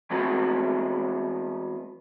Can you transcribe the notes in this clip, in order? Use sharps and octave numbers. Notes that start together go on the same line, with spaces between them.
E3 G#3 B3 C4 F#4